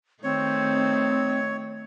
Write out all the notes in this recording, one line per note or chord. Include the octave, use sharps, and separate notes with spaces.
D#3 A3 C4 C#5